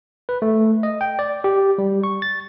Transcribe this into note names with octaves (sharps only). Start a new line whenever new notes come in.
B4
A3
D#5
G5
D5
G4
G3
C#6
A6